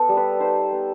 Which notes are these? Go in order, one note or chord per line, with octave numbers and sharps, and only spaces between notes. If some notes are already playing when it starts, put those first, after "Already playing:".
Already playing: B3 A4
G3
B4
D#4 C5
B3